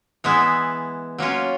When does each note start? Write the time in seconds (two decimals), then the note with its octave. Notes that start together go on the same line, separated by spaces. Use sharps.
0.24 E3 G#3 B3 E4
1.18 F#3 A#3 C#4 F4